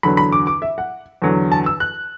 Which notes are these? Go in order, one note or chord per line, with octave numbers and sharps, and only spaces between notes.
E2 D3 F#3 B5
B5
D6
D6
E5
F#5
E2 D3 F#3
A5
E6
F#6